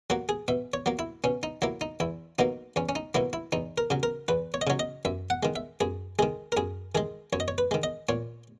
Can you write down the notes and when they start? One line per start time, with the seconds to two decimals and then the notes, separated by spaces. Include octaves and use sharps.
0.10 F#3 A#3 F#4
0.29 G#4
0.48 B2 E5
0.74 C#5
0.86 F#3 A#3
0.99 E4
1.24 B2 C#4
1.43 D#4
1.62 F#3 A#3 E4
1.81 D#4
2.00 E2 E4
2.39 B2 F#3 A#3 D#4
2.76 E2 C#4
2.89 C#4
2.95 D#4
3.14 B2 F#3 A#3 E4
3.33 E4
3.52 E2 D#4
3.78 A#4
3.90 C#3 F#3
4.03 A#4
4.28 E2 B4
4.54 C#5
4.61 D#5
4.67 C#3 F#3 C#5
4.79 D#5
5.05 F#2 E5
5.30 F#5
5.43 D#3 G#3
5.56 E5
5.80 F#2 G#4
6.19 D#3 G#3 G#4
6.52 A#4
6.57 F#2 G#4
6.95 D#3 G#3 G#4
7.33 F#2 C#5
7.40 D#5
7.48 C#5
7.58 B4
7.71 D#3 G#3
7.83 D#5
8.09 A#2 C#5